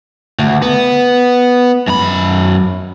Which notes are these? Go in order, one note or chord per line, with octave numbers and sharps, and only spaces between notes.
D2
B3
F#2 B5